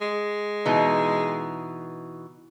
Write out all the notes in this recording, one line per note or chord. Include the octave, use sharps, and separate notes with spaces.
G#3
B2 E3 D#4